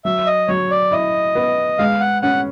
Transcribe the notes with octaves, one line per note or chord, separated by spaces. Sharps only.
F#3 E5
D#5
F#3 C#5
D5
E4 D#5
B3
G#3 F5
F#5
C#4 F#5